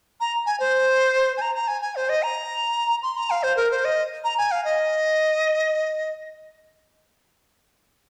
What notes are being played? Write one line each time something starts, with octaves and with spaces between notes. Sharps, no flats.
A#5
G#5
C5
G#5
A#5
A#5
G#5
G#5
C5
D#5
A#5
C6
A#5
F5
C5
A#4
C5
D#5
A#5
G#5
F5
D#5